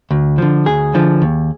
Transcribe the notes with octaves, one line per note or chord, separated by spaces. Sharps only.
D2
D3 F3
D2 G#4
D3 F3
D#2